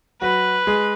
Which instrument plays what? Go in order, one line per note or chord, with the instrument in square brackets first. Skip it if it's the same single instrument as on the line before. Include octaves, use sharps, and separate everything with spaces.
[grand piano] F#3 F#4 [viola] B4
[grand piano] G#3 G#4